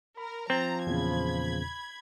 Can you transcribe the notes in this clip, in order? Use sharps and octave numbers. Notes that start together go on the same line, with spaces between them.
A#4 B5
F3 C4 A#5 A6
E2 A#2 C#3 B5 G#6